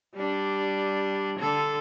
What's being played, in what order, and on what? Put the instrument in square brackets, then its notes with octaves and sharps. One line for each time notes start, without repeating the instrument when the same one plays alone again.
[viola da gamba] G3 D4
D3 A4